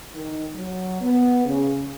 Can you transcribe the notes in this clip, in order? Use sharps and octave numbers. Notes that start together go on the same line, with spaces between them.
D#3
F#3
B3
C#3